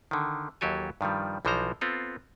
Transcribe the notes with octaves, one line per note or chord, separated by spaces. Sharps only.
D3 D#3
D#2 E3 F#3 G4 A4 G#5
G2 D#3 F3 G3
B1 E3 F3 F#4 C5 A#5
B3 C4 F4 A4